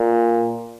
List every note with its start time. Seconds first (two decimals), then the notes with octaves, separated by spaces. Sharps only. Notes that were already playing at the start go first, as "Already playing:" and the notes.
Already playing: A#2